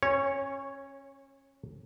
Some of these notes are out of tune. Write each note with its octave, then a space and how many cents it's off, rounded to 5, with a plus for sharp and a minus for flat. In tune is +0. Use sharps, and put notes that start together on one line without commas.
C#4 -25 C#5 +0